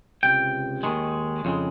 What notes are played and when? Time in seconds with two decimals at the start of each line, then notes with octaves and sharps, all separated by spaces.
0.23 C#2 C3 G5
0.83 D#2 D#3 G#3
1.45 F2 C#3 G#3